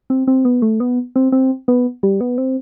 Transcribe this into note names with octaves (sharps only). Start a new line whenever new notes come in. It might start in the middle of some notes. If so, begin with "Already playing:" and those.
C4
C4
B3
A3
B3
C4
C4
B3
G3
B3
C4